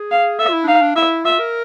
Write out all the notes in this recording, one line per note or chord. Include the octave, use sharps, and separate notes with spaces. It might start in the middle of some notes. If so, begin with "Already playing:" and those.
Already playing: G#4
F5
A4 E5
F4
E4
D4
D#4 F5
D4
E4 E5
F4 E5
A#4